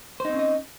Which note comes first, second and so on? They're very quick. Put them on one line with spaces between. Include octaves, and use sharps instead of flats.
C5 D#4 C4 C#4 D#5